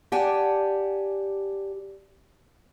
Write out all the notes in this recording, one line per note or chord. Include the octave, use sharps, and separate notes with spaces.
G4 D5 F#5 G#5 A5